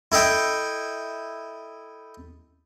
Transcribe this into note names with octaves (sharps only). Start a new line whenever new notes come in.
E4 A4 D#5 G5